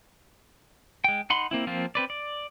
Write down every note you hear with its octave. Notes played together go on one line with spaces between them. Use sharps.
G#3 G5
D#4 F#5 B5 C6
A#3 C4 E4
F3 A#3 C4 F4
C4 B4 D5
D5